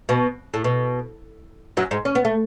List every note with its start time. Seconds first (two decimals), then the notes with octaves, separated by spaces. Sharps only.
0.09 B2
0.54 A2
0.64 B2
1.77 F#2 F#3
1.91 G#2 G#3
2.05 C#4
2.15 B3
2.25 A3